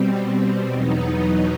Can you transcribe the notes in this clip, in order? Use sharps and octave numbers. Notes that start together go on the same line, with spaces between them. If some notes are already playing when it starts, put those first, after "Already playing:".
Already playing: B2 G3 C4
E2 B2 F#3 B3 D#4